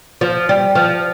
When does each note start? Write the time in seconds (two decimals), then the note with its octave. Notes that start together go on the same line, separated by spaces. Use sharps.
0.21 F3
0.49 G3
0.75 F3